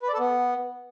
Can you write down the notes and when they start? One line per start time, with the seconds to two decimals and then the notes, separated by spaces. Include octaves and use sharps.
0.03 B4
0.08 D5
0.13 A4
0.19 B3